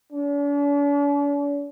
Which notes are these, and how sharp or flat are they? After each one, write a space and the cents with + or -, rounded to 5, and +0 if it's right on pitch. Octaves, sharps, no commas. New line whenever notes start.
D4 -45